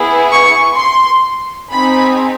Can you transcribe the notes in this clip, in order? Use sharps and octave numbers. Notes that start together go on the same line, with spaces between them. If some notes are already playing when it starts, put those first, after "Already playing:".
Already playing: B3 E4 G#4
C#6
C6
C4 D#4 G#4 B5